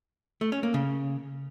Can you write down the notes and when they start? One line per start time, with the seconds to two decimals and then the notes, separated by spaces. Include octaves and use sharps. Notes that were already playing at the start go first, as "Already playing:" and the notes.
0.41 A3
0.52 C#4
0.63 A#3
0.74 C#3